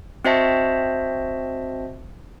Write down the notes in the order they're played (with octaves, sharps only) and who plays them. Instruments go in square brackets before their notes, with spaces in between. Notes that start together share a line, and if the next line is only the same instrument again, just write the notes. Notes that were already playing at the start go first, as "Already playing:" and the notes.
[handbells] C4 F#4 C5 D#5 E5 A5